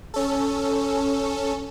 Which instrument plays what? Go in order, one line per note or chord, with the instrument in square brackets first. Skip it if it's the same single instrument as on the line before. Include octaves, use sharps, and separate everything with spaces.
[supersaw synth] C#4 A4